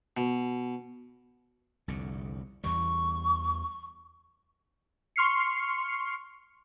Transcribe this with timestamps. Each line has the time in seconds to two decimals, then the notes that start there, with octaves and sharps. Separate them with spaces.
0.17 B2
1.88 C2 F2 D3
2.64 E2 E3 G3 C#6
5.16 C6 C#6 F6 C7 C#7